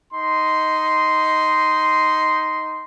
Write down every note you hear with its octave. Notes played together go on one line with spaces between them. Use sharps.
D#4 C6